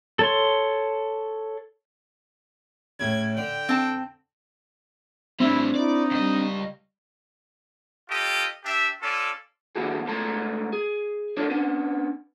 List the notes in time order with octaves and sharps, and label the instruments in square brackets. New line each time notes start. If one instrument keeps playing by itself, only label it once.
[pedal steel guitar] A4 C#5 C6
[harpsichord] A2 C#3 [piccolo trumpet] G#6
[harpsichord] D3 [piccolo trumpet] G5
[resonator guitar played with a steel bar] C4 A5
[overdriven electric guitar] A2 G3 [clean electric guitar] C4 D4 [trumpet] E4
[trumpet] D#4 [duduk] E4 [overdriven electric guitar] D5
[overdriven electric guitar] C#2 D#5 [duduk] G3
[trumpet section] F4 G4 A4 D#5
D4 G4 E5
C#4 F4 A4 D5
[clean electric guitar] D3 D#3 A#3 E4 F#4 G#4
C#2 C#3 A3 A4 A#5 C6
G#4
D4 D#4 A4 A#4 C#5 D5
B3 C#4 D4